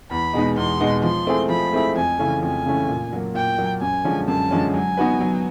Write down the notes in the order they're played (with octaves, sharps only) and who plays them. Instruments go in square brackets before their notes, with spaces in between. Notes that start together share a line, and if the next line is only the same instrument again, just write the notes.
[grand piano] E2 [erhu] B5
[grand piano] B2 G#3 B3 D#4
[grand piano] E2 [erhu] C6
[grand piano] B2 G#3 B3 D#4
[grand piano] F3 [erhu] C6
[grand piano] A3 C4 E4 G#4
[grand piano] F3 [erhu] B5
[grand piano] A3 C4 E4 G#4
[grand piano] F2 [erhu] G#5
[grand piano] C#3 E3 A3 C#4
[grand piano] F2 [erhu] G#5
[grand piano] C#3 E3 A3 C#4
A#2
F#3 A#3
[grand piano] A#2 [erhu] G5
[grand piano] F#3 A#3
[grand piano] F#2 [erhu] G#5
[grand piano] D3 F3 G#3 C#4
[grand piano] F#2 [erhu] A5
[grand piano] D3 F3 G#3 C#4
[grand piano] F#3 [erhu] G#5
[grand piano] B3 D#4 F#4 B4
F#3